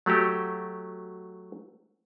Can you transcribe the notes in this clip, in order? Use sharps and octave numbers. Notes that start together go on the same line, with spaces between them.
F#3 A3 F#4 G4